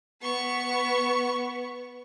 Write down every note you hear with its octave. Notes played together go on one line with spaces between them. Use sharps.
B3 C#6